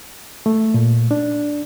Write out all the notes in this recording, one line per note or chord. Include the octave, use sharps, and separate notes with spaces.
A3
A#2
D4